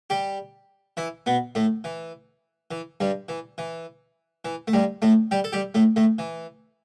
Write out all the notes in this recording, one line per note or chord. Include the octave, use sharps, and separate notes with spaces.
G3 G4
E3 E4
B2 B3
A2 A3
E3
E3
G2 G3
E3
E3
E3
A3
G2 G3
A2 A3
G3 G4
A4
G3 G4
A2 A3
A2 A3
E3